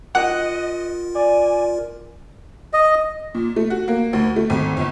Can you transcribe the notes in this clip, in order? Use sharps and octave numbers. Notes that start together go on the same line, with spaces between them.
F4 A#4 D#5 F#5
D5 G#5
D#5
A#2
A3
F#4
A#3
D2
A3
G#1
G1